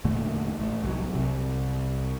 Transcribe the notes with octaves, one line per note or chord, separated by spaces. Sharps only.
E2 A#2 D3 A3
A1 A3
C2 E3 F#3
C2 C3